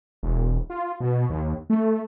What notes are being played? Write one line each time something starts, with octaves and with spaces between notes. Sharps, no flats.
E1
F4
B2
D#2
A3